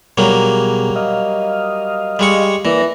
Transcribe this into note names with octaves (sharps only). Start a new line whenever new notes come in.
B2 F#3 G3 A#3 G#4
D#5 F5
G3 G#3 C#6
E3 A#3 D5 A#6